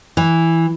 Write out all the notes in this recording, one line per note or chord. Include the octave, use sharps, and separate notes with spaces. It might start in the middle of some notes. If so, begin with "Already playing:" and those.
E3